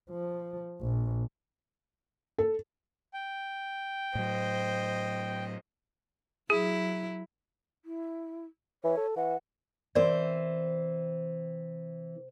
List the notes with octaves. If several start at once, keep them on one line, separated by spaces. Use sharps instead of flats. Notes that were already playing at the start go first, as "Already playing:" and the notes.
F3
A#1
A4
G5
A2 F#3 C5 D#5
F#3 E4 G#4
E4
E3 C#5
A4
E3 F#5
C3 E3 C4 A#4 C5 D5